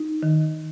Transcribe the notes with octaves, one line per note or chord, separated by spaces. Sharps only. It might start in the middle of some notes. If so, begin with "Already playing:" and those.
Already playing: D#4
D#3